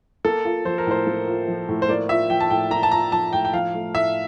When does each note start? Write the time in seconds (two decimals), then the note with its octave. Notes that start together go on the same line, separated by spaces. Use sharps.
0.25 A#3 A4
0.45 F4
0.65 F3 C5
0.78 A#4
0.87 A2 C5
1.07 A#3
1.27 F4
1.48 F3
1.69 A2
1.82 C5
1.89 A#3 D5
2.09 F4 E5
2.30 F3 G5
2.40 A5
2.50 A2 G5
2.71 A#3 A#5
2.83 A5
2.91 F4 A#5
3.12 F3 A5
3.33 A2 G5
3.45 G5
3.53 F3 F5
3.74 A3
3.94 A2 E5